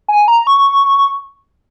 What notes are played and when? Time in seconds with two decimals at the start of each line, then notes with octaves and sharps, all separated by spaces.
0.08 G#5
0.28 A#5
0.47 C#6